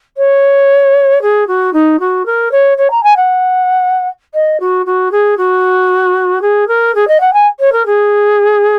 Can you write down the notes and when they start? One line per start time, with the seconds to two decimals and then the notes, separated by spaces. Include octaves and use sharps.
0.17 C#5
1.22 G#4
1.47 F#4
1.73 D#4
2.00 F#4
2.26 A#4
2.51 C#5
2.77 C#5
2.90 A#5
3.03 G#5
3.16 F#5
4.34 D#5
4.60 F#4
4.86 F#4
5.11 G#4
5.37 F#4
6.41 G#4
6.68 A#4
6.95 G#4
7.08 D#5
7.20 F#5
7.33 G#5
7.60 C#5
7.72 A#4
7.86 G#4